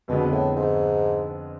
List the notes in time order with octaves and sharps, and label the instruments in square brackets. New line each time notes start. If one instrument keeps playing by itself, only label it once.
[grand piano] F2 D3 G#3 B3 [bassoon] B2
[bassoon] A2
G#2